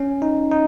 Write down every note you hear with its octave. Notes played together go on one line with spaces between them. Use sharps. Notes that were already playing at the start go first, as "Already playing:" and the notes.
Already playing: C#4
D#4
D#4